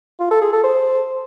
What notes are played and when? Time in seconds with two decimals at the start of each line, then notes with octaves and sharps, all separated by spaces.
0.20 F4
0.31 A4
0.42 G#4
0.53 A4
0.63 C5